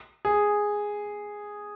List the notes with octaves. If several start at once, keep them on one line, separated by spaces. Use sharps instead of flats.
G#4